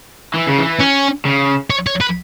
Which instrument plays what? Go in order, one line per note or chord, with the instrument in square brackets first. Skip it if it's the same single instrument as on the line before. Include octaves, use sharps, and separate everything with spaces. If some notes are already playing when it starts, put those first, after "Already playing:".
[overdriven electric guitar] E3
C#3
E3
[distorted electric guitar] C#4
[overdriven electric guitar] C#3
[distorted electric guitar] C#5
C#5
B4